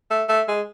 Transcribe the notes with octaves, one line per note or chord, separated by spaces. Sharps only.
A3
A3
G#3